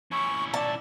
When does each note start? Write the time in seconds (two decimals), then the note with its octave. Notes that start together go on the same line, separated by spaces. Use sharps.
0.12 C#4 E4 C#6
0.54 D5 A5